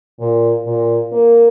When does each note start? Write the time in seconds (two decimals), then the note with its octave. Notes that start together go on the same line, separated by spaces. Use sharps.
0.19 A#2
0.65 A#2
1.12 A#3